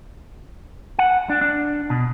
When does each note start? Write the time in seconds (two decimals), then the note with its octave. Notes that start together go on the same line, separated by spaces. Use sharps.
0.99 F#5
1.30 D4
1.41 D4
1.90 B2